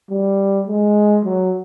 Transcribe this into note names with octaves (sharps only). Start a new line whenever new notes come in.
G3
G#3
F#3